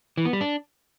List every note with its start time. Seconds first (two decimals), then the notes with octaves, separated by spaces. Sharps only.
0.17 E3
0.25 B3
0.33 G3
0.41 D4